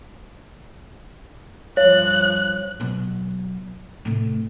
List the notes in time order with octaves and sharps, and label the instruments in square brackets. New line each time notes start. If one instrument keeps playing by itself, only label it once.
[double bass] G2 F3 [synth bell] C#5 [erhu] F#6
[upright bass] B2 F#3
A2 C3